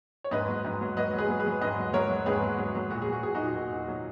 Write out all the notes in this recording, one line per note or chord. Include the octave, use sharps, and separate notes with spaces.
C#5
G#2 B4 D#5
F#3
G#2
F#3
F#3 B4 D#5
F#3
G#4 B4
F#3
G#4 B4
F#3
G#2 B4 D#5
F#3
F#3 A#4 C#5
F#3
G#2 G#4 B4
F#3
F#3
F#3
A#2 F#4
G#4
F#3 F#4
A#2 G#4
D#4 F#4
A#2
A#2
A#2
F#3